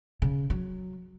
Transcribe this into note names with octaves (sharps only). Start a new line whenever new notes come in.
C#3
F#3